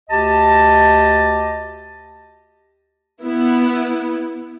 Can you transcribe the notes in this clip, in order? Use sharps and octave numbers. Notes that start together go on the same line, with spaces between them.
D2 G4 D#5 A5
B3 E4